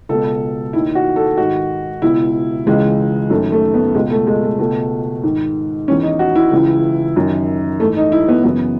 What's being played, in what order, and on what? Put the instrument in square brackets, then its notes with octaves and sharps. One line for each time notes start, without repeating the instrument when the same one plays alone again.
[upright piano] C#2 B2 A4
D#2 D#3 E4
F#4
A4
G#2 D#3 F#4
C#2 B2 E4
C#2 C#3 E3 G#3
F#2 D#3 A3
A3
B3
C#2 B2 G#3
A3
G#3
A3
C#2 B2 A3
G#2 D#3
E2 D#3 C#4
D#4
F#4
E4
C#2 C#3 E3
F#2 D#3
G#2 A3
E3
D#4
E4
B3
F#2 C#3 E3 B3